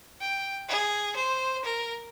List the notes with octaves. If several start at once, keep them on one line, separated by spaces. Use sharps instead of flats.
G5
G#4
C5
A#4